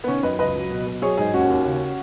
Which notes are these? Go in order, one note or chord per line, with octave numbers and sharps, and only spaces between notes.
B3
D#3 C#4
F#2 B4 D#5
C#2 B4 D#5
F#3
B2
B2
F#3 G#4 C#5
G#2 D#4 G#4
D#2 C#4 F#4
D#2
C#3